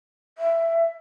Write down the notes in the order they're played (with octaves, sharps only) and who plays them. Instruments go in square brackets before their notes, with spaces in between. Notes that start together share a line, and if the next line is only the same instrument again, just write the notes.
[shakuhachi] E5